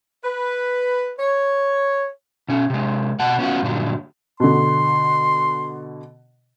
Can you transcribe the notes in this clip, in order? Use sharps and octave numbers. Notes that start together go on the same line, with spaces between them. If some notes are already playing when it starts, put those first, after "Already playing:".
B4
C#5
B2 C#4
C3 G#3
B2 F#5 A5
B3 C#4 F4 F#4
G2 A#2 D3 F#3
B2 D3 C6